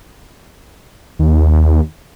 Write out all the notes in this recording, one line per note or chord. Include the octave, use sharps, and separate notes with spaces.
D#2